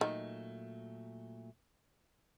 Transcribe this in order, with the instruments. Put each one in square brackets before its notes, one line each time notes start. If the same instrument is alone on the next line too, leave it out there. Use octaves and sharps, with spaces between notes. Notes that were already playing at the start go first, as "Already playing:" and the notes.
[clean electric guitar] A#2 F#3 A3 [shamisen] D#3